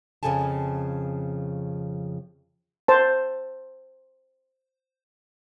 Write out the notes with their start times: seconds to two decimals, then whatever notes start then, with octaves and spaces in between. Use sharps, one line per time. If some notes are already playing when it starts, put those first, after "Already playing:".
0.23 F2 C#3 F3 A4 G#5 A5
2.88 C5 A5